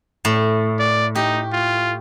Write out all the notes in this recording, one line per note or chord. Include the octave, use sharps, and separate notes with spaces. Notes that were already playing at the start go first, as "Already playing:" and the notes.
A2
D5
D#4 G4
F4